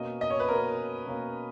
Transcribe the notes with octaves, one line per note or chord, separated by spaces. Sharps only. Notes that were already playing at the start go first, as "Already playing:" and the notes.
Already playing: B2 A#3 C#4 D#5
D#5
C#5
B4
B2 A#3 C#4 A#4
B2 A#3 C#4